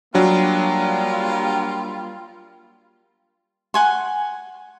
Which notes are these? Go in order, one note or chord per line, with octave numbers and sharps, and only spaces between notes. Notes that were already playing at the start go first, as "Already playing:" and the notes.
F#3 G3 A#3 D4 F4
F#5 G#5 C6